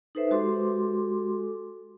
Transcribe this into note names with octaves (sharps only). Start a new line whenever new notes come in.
D#4 A4 B4 C5 E5
G#3 F#4 G4 A4 C6 D6